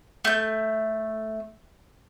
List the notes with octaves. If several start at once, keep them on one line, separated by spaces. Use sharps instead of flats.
A3 G6